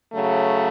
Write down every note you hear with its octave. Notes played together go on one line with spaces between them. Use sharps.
C#3 F#3 A3